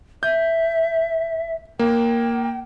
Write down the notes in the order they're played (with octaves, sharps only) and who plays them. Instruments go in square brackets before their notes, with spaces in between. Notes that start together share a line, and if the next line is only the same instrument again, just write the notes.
[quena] E5 [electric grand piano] G6
[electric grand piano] A#3 [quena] G5